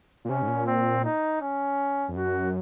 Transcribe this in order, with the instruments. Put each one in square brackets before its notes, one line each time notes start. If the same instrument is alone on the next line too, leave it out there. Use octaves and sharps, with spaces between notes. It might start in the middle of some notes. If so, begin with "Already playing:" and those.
[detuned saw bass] A#2
[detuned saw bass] C3 [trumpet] C#4
[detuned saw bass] G#2
A#2
[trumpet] C4
D#4
C#4
[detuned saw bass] F2
[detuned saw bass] F#2 [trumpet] F#4